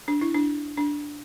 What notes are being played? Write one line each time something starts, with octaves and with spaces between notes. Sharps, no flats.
D4
E4
D4
D4